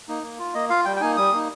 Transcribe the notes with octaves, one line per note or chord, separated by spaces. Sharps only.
A#3 D#4
A#3
F4
A#3 D#5
F4 F5
G3 G5
G5
A#3 D#4 G#5
G3 D#6
A#3 D#4